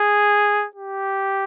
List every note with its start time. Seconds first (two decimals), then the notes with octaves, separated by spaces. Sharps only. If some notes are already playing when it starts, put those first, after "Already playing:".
Already playing: G#4
0.76 G4